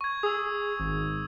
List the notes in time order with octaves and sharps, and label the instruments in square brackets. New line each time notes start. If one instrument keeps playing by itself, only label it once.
[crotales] C#6 G#6
[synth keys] G#4 [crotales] D#6 E6
[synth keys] G#1